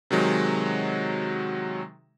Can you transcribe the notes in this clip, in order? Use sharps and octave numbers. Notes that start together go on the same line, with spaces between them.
C3 D#3 F#3 G#3